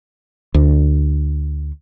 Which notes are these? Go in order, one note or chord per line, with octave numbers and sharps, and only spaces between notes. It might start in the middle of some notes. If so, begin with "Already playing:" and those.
D2